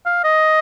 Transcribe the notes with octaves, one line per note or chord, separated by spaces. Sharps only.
F5
D#5